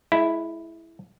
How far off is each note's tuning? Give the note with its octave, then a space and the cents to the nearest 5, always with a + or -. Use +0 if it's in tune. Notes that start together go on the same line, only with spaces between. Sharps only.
G#3 +30 E4 +0